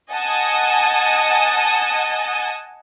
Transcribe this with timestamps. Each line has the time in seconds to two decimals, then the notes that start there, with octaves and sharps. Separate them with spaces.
0.11 D#5 F#5 G#5 A5 D#6